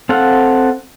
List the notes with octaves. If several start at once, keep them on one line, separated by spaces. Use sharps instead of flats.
C4 A4 F5 F#5